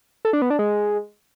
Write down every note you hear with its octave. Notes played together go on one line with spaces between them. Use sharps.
A4
D4
B3
D4
G#3